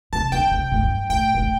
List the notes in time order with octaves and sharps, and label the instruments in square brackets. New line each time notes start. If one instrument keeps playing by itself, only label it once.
[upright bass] C3 [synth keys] A5
[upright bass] D3 [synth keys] G5
[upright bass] C3
A2
G2
[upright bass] A2 [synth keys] G5
[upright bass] A#2
A2